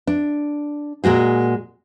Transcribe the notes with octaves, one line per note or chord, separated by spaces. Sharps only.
D4
A#2 G#3 F#4 G#4